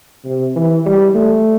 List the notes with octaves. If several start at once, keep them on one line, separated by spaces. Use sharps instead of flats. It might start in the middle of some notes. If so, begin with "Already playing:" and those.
C3
E3
G3
A3